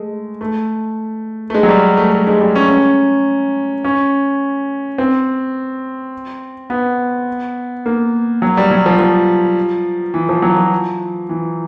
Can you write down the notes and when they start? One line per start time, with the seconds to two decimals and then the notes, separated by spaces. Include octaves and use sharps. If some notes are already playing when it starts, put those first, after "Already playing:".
Already playing: G#3 A3
0.41 A3
1.50 A3
1.54 G#3
1.63 F#3
1.69 G3
1.97 A3
2.12 A3
2.27 G#3
2.41 G3
2.55 C#4
2.69 C#4
3.84 C#4
4.98 C4
6.70 B3
7.86 A#3
8.42 F#3
8.57 G3
8.71 F#3
8.86 F3
8.99 F3
10.14 E3
10.29 F3
10.42 F#3
10.57 F3
11.29 E3